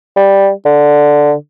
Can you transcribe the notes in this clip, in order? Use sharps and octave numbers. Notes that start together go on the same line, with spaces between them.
G3
D3